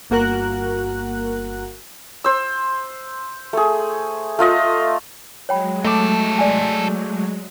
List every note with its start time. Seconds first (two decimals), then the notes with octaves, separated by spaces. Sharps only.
0.10 G1 A#3 F#4 A#4 F#6
2.24 C5 E6
3.53 A3 G#4
4.39 A3 F4 D#5
5.49 F#3 G#3 C#5 G5 B5
5.85 A3 D#4 A4 D6
6.39 D5 G#5